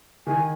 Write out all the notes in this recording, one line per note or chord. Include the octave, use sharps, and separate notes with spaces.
D#3 G#5